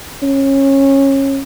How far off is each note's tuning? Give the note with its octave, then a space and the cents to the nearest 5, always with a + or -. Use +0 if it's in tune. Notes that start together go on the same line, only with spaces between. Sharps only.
C#4 -20